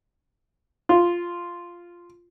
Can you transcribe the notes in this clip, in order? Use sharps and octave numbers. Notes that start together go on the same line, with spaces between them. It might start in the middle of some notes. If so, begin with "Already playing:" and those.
F4